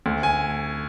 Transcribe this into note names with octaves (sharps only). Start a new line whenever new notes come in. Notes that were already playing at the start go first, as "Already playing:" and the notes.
D2
G#5